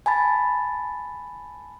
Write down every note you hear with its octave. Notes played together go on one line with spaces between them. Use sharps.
G#5 A5 B5 A6